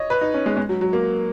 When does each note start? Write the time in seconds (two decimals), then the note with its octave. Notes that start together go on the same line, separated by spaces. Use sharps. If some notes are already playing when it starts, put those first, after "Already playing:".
Already playing: C#5 D#5
0.10 B4
0.21 D#4
0.34 C#4
0.46 G#3
0.57 G#3
0.69 F#3
0.81 F#3
0.93 A#3